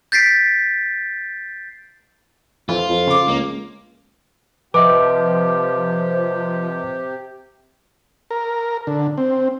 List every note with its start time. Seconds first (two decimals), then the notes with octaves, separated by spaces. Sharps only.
0.12 G6 A6 B6 C7 D7
2.69 F2 E3 F4
2.89 F2
3.07 C#3 D6
3.28 C#2 A#3
4.74 C3 F3 G4 B4 D#5 E5 D6
8.31 A#4
8.87 D3
9.18 C4